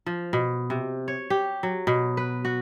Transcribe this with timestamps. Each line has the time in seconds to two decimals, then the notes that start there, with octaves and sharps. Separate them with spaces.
0.06 F3
0.33 B2
0.70 C3
1.08 C#5
1.30 G4
1.63 F#3
1.87 B2
2.17 B4
2.45 F#4